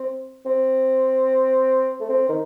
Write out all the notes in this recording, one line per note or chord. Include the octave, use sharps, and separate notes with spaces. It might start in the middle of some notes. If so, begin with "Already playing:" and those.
Already playing: C4
C4
A3
C4
D#3